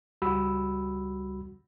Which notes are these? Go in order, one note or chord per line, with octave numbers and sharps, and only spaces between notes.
C#2 G3 F#4 B5 E6